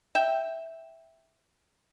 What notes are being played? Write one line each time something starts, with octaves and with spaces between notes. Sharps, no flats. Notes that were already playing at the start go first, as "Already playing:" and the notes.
E5 G5